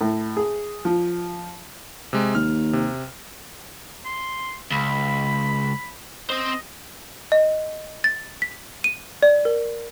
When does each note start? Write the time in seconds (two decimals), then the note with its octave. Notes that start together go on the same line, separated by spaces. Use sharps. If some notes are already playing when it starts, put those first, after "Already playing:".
0.01 A2
0.37 G#4
0.85 F3
2.13 C3 G#3
2.35 D#2 F6
2.73 C3
4.05 C6
4.72 C#2 B5
6.30 C4 C5 D#5
7.32 D#5
8.04 A6
8.42 B6
8.84 D#7
9.22 D5
9.45 A#4